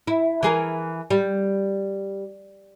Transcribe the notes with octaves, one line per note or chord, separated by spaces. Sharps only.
E4
E3 G#4 A#4
G3